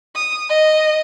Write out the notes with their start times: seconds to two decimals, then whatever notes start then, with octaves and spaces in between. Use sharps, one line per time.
0.15 D#6
0.50 D#5